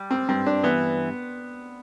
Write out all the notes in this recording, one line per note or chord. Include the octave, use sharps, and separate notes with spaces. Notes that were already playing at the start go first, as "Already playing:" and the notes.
Already playing: G3
C4
G2 C4
D4
E3 B3